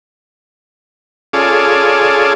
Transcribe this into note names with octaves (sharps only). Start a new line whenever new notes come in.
C#4 F4 G#4 A4 D5